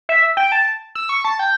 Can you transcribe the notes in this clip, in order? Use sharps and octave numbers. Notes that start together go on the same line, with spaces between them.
E5
G5
A5
E6
C#6
A5
G5